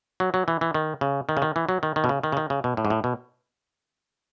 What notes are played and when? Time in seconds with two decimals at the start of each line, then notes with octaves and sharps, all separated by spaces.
0.20 F#3
0.34 F#3
0.48 E3
0.61 E3
0.74 D#3
1.01 C#3
1.29 D#3
1.37 C#3
1.42 D#3
1.56 E3
1.69 F#3
1.83 D#3
1.96 D#3
2.04 B2
2.09 C#3
2.24 D#3
2.32 C#3
2.37 D#3
2.50 C#3
2.64 B2
2.77 A2
2.85 G#2
2.90 A2
3.04 B2